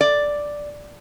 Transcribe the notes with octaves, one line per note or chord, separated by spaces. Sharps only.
D5